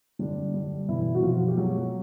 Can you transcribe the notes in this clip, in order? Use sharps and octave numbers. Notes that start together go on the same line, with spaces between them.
D3 G3 D4
G3
B2 E3 E4
F#4
B2 F3 F4
G4
F#3 G#3 F#4